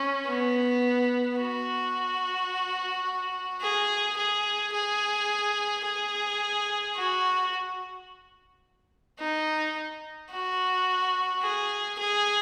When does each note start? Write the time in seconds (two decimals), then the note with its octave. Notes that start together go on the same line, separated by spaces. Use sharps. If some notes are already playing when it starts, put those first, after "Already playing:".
Already playing: C#4
0.27 B3
1.39 F#4
3.61 G#4
4.17 G#4
4.73 G#4
5.85 G#4
6.96 F#4
9.19 D#4
10.31 F#4
11.42 G#4
11.99 G#4